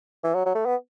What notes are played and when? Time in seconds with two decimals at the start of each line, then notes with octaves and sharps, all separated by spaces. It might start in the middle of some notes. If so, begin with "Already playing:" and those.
0.24 E3
0.34 F#3
0.46 F#3
0.55 A3
0.66 B3